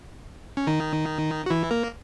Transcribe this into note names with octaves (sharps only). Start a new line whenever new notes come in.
C#4
D#3 D#4
F#4
E3 E4
A#3 A#4